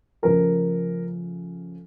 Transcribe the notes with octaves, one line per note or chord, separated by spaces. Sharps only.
C#3 F3 A3 A#4